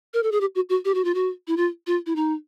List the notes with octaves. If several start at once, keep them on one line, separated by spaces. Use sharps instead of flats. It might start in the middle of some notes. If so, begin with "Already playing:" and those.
A#4
A4
G#4
G4
F#4
F#4
G4
F#4
F4
F#4
E4
F4
F4
E4
D#4